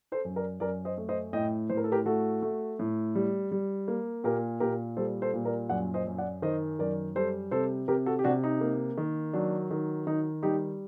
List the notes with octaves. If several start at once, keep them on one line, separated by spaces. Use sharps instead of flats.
A4 C5
F#2
A#4 D5
F#2 A#4 D5
C5 D#5
A3
C5 D#5
A2 D#5 G5
A2 C5
A#4
A4
G4 A#4
A3 F#4 A4
A3
A2
G3
G3
A#3
A#2 G4 A#4
A#2 G4 A#4
G3 A4 C5
A4 C5
A#2
A#4 D5
F#2 D5 F#5
C5 D#5
F#2
D5 F#5
D#3 C5 D#5
F#2 A#4 D5
G3 A4 C5
C3 A4 C5
C3 G4 A#4
F#4 A4
G4
C3 D4 F#4
D#4
A#3
D#3
F#3 D4
D#3
D#3 D#4
G3 D#4 G4